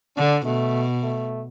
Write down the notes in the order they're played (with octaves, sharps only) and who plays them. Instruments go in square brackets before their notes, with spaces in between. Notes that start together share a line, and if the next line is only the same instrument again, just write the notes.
[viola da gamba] D3 [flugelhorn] D4
[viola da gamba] B2 [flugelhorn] A3
[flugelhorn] A3